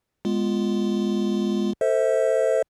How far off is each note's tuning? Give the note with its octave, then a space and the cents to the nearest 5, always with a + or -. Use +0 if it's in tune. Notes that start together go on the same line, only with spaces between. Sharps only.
G#3 -5 B3 +0 F4 +0
A4 +25 C5 +0 E5 -25